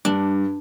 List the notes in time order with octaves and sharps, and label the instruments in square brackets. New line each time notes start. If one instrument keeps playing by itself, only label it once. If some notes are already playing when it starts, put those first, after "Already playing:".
[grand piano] G2 [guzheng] D4